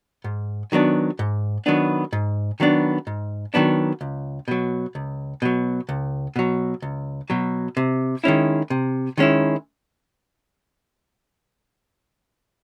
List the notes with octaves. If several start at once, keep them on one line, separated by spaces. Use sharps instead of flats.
G#2
D#3 F#3 B3 D4
G#2
D#3 F#3 B3 D4
G#2
D#3 F#3 B3 D4
G#2
D#3 F#3 B3 D4
C#2
B2 F#3
C#2
B2 F#3
C#2
B2 F#3
C#2
B2 F#3
C3
D#3 G#3 C#4 E4
C3
D#3 G#3 C#4 E4